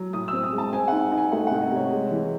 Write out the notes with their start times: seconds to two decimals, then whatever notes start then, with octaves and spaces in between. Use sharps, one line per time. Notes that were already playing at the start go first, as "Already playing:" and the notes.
Already playing: F#3
0.13 A2 D#6
0.28 C4 E6
0.43 D#6
0.53 G#3
0.58 A5
0.73 C4 G#5
0.88 D#4 F#5
1.12 D#4
1.17 G#5
1.32 A3 F#5
1.47 C3 F#5
1.61 D#5
1.72 C3 C#5
1.92 G#3
2.11 E3